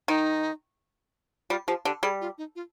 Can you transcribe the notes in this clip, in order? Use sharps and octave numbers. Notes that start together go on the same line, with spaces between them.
D#3 D#4
G3 F4
F3 G4
D3 G4
G3 G#4
F4
D#4
F4